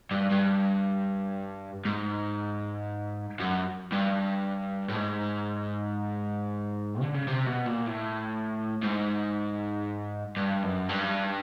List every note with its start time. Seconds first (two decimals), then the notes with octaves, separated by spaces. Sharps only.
0.11 G2
0.30 G2
1.85 G#2
3.40 F#2
3.92 G2
4.89 A2
4.96 G#2
7.01 D3
7.14 C#3
7.28 C3
7.46 B2
7.66 A#2
7.86 A2
8.83 G#2
10.37 G2
10.63 F#2
10.89 G2